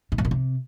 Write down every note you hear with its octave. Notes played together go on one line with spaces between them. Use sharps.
G#2
G2
A#2
C3